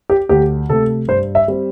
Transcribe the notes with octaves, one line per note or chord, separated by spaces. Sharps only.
G4
D2 G4
C3 A3 A4
G2 C5
E5
G3 C4